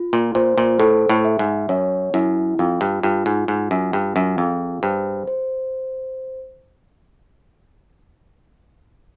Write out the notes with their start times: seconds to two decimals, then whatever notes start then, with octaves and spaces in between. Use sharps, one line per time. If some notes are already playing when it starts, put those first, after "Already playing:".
Already playing: F4
0.13 A#2
0.35 A#2 C5
0.58 A#2
0.79 A2 A4
1.09 A2
1.25 E5
1.39 G#2
1.69 F#2 C#5
2.14 F#2 E4
2.59 F2 F4
2.81 G2
3.03 G2 F4
3.26 G#2
3.48 G#2 F4
3.71 F#2
3.93 G2 F4
4.16 F#2
4.38 F2 G#4
4.83 G2 C5
5.27 C5